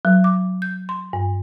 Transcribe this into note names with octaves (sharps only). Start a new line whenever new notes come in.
F#3
D6
G6
C6
G2